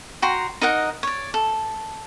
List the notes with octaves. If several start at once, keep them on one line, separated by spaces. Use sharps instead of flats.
F#4 G5 A#5 C6
D#4 A#4 D#5 F#5
C#5 D5
A4